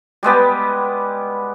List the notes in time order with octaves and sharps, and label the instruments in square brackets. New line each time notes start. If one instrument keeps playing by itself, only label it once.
[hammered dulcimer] G3 G#3 B3 G4